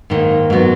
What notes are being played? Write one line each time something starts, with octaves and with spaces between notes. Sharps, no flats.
G#2 D#3 A#3
G#2 F#3 B3